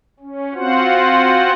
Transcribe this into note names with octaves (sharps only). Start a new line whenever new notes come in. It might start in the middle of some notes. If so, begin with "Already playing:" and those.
C#4
C4 F4 F#4 C5 F#5